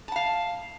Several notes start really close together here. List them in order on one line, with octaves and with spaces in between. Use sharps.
A5 F#5 F5